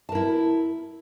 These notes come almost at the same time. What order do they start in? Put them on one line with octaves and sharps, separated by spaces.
A5 A#4 E4